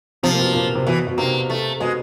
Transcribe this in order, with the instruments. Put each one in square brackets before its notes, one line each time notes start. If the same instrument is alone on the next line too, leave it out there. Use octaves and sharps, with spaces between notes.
[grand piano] C3 C4 [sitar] F3
[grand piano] A#3
B2 B3
A#2 A#3
C3 C4
[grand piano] B2 B3 [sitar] E3
[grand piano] B2 B3
[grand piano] C3 C4 [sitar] A#3
[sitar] A3
[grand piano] B2 B3 [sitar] G#3